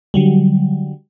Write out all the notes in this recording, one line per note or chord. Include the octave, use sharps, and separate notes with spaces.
D3 F#3 G3